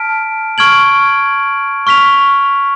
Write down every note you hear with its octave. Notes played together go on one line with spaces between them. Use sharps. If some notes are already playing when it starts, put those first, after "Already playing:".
Already playing: A5 F6 B6 D7
C#6 F6 G#6 D7 F#7
C#6 F6 B6 F7